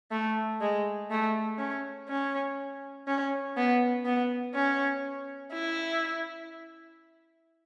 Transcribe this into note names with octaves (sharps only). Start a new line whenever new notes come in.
A3
G#3
A3
C#4
C#4
C#4
B3
B3
C#4
E4